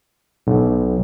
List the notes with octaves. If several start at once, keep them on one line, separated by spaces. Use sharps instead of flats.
B1